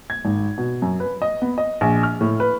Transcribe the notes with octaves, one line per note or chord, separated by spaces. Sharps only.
G#6
G#1
B2
F#2
B4
D#5
B3
D#5
A#1
F6
A2
B4